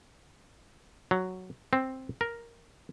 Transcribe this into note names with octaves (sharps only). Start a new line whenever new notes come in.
F#3
C4
A#4